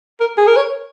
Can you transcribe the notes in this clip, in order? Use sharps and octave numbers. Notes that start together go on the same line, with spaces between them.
A#4
G#4
A#4
C#5